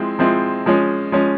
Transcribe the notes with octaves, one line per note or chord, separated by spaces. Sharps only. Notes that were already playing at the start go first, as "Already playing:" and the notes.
Already playing: F3 G#3 C4 E4
F3 G#3 C4 E4
F3 G#3 C#4
F3 G#3 C#4